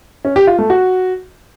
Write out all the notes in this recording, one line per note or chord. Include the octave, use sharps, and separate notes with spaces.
C#4
G4
F4
A3
F#4